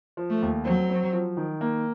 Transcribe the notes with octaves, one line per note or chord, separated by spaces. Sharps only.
F3
A3
D#2
F#3 C4
C4
F3
D#3
A#3